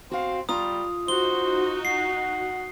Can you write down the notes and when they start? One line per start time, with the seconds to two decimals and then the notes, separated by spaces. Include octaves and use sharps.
0.11 C4 F#4 F5
0.49 G3 F4 A#5 D#6
1.08 D#4 F#4 C5 G7
1.85 F#5 C7